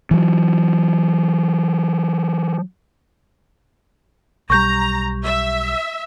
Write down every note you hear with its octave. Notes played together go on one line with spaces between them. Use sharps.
E3 F#3
B1 G3 A#5 C#6 G6
E5